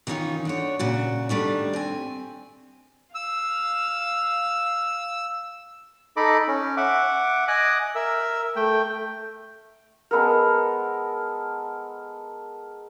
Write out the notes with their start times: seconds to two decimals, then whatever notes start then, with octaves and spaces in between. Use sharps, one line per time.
0.07 D#3 E3 B3 C#4 D#4 F4
0.45 D3 F#4 C#5
0.79 A#2 C#3 F#4
1.29 D#3 G3 A3 D4
1.73 C4 G#5
3.15 F5 E6
6.17 D#4 A4 D#5 B5 D6
6.48 C#4
6.77 E5 F#5 D6
7.48 D#5 G#5 D6 D#6 F#6
7.95 A#4 E5 E6
8.56 A3 G5
10.11 G#3 B3 A4 A#4